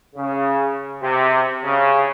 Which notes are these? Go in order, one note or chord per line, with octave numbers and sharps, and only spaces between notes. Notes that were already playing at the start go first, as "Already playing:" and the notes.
C#3
C3
C#3